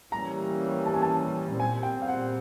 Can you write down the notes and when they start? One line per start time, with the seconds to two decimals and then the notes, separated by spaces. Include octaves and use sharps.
0.12 E3 G3 A#3 C#4 A#5
0.86 A5
0.94 G#5
1.02 A5
1.59 A#2 G3 C4 G#5
1.83 G5
2.02 F5
2.08 F#5